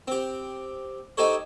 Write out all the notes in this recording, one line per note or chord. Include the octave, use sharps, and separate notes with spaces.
C4 G4
D#4 G4 A4 C5 C#5